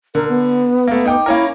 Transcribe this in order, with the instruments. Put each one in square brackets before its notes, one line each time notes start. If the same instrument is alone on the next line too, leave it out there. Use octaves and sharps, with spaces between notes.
[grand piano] D3 [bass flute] A#4
[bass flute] B3
[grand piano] A3 A#3
D#4 G5 D6
[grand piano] A#3 C#4 A#4 [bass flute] E4